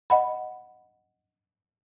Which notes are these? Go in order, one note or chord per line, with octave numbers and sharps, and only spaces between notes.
D#5 F#5 B5